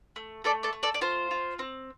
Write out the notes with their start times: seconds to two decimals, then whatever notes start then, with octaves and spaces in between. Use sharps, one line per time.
0.16 A3
0.44 A3 A4 D5
0.63 A4 D5
0.73 A3
0.83 A4 D5
0.94 D5
1.01 F4 C5
1.31 F4
1.59 C4